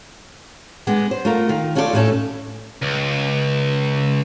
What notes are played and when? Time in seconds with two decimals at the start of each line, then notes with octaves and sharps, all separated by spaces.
0.87 G#3 B3 D4
1.11 C5
1.25 A3 F4 A#4
1.49 D#3 F4
1.75 A3 C#4 F4 A4 A#4 D5
1.93 A2 A3 C#4 A4
2.82 C#2